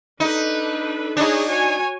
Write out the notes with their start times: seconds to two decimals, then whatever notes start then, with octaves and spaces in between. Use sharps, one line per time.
0.20 D4 D#4 A4 B4
1.17 D4 D#4 G#4 C#5 D#5
1.47 F#4 C#5 G#5